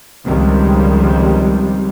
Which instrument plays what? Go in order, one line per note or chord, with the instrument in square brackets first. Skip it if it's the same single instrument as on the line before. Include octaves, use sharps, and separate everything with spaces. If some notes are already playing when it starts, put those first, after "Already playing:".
[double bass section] C#2 C3 D#3 F3 G3 G#3